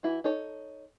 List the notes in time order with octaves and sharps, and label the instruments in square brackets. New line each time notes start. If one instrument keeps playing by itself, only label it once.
[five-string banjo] E3 E4 F#4
D#4 A4 C#5